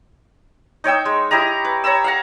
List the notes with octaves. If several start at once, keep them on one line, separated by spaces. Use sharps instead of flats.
D#4 C#5 G5 E6
G#3
E4 G4 D#5 A#5
B4
C#5 A#5 B5 E6
F5 F#5 A#5